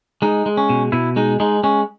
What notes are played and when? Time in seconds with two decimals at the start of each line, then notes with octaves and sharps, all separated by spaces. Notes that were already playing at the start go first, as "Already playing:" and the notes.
0.22 G#3 D#4
0.46 G#3
0.57 C#4
0.70 B2
0.92 B2 E4
1.16 G#3 D#4
1.40 G#3 D#4
1.63 G#3 C#4